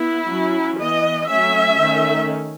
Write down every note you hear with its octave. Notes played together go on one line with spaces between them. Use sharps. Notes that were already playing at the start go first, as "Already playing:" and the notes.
Already playing: B3 E4
F#3 C#4
E3 B3 D#5
F#3 A3 C#4 E5
D#3 A3 C#4